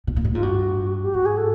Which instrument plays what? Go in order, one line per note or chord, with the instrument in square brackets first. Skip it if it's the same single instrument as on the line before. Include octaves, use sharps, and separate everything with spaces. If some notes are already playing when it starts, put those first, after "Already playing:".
[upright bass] B2
A#2
A2
[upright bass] G#2 [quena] F4
[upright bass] G2 [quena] F#4
[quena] G4
[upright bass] G#2 [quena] F#4
[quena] G#4
A4